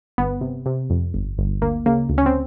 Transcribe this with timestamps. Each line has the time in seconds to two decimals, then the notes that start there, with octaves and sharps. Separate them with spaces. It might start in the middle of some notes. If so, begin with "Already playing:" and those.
0.18 G1 B3
0.41 C3
0.66 C3
0.90 F2
1.14 G1
1.38 G1
1.62 D2 A#3
1.86 C#3 A#3
2.09 D2
2.18 C#4
2.26 C4